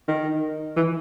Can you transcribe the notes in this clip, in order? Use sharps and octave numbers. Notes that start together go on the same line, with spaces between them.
D#3
E3